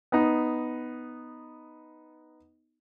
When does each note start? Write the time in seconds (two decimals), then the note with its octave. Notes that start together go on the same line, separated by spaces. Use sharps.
0.12 B3 D#4